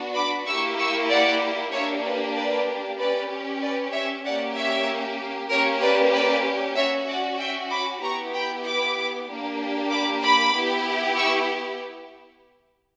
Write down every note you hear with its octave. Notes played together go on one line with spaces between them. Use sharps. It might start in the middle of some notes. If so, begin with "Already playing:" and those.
Already playing: B3 D4 F#4
B5 D6
A#3 E4 G4 C#6 E6
C#6 E6
D5 F#5
A#3 D4 G4 C#5 E5
B4
B4 D5
C#4 G4 B4 D5
B4 D5
C#5 E5
A#3 C#4 G4 D5 F#5
C#5 E5
A#3 C#4 G4 A#4 C#5
B4 D5
B4 D5
C#4 F#4 C#5 E5
D5 F#5
E5 G5
B5 D6
B3 E4 G4 A#5 C#6
G5 B5
B5 D6
A#3 D4 G4
B5 D6
B5 D6
B3 E4 G4
C#6 E6